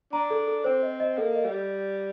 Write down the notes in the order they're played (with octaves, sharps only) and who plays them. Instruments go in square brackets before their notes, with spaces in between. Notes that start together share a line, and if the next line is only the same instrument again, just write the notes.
[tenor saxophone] D4 [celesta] A#5
[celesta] A4
A4
[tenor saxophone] C4 [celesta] C5
[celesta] D#5
D#5
[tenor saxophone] A#3 [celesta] A4
[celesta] D#5
[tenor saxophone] G3